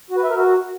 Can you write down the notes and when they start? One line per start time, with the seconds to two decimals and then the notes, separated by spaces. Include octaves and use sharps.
0.11 F#4
0.17 B4
0.24 E5
0.30 A#4
0.37 F#4